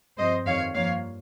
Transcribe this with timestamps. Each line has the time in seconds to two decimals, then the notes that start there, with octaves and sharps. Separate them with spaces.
0.17 G2 F3 C4 C5 D#5
0.45 F2 D#3 G3 C4 C#5 F5
0.74 G2 F3 A#3 C#5 F5